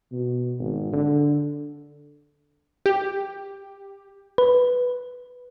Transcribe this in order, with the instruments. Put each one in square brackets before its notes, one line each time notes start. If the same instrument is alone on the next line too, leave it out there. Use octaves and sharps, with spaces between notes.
[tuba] B2
G#1
D3
[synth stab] G4
[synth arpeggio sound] B4